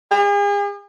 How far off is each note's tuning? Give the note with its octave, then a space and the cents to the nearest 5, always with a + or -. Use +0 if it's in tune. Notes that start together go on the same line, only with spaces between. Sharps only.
G#4 -40